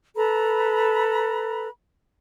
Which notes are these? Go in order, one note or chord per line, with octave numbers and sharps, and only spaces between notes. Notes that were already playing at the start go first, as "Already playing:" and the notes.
A4 B4 A#5 B5